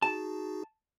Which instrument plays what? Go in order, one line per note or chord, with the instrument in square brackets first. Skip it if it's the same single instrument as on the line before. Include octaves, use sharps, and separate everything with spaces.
[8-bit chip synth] D#4 F#4 G#4 [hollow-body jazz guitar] A5